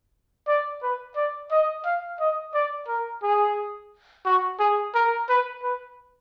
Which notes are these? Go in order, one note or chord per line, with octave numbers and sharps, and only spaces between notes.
D5
B4
D5
D#5
F5
D#5
D5
A#4
G#4
F#4
G#4
A#4
B4
B4